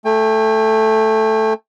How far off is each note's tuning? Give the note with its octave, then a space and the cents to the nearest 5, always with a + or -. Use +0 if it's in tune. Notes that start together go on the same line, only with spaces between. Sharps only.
A3 +0 G5 +40